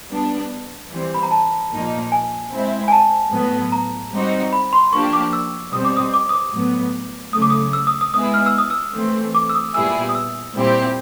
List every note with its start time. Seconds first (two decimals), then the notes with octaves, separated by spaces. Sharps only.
0.11 G3 B3 D4
0.91 E3 G3 C4
1.14 B5
1.23 A#5
1.31 A5
1.72 A#2 F3 A#3 D#4
2.12 G#5
2.52 G#3 C4 E4
2.88 G#5
2.92 A5
3.32 A2 F#3 B3
3.72 A#5
4.12 G3 C4 D#4 F#4
4.53 B5
4.73 C6
4.92 F3 A#3 D4 G4 C#6
5.13 D6
5.33 E6
5.73 B2 G3 C4 D#6
5.85 D6
5.97 D#6
6.14 D6
6.29 D#6
6.33 D6
6.53 A2 F#3 B3
7.33 C#3 F#3 A3 D#6
7.42 D6
7.50 D#6
7.73 E6
7.87 D#6
8.01 D#6
8.13 G#3 B3 E4 G#4 D#6
8.34 F6
8.46 E6
8.58 D#6
8.70 E6
8.94 E3 A3 C4
9.35 D6
9.50 E6
9.55 D#6
9.74 A#2 G3 B3 E4 G#4 E6
10.09 D#6
10.15 E6
10.54 A#2 G3 C4 E4 G4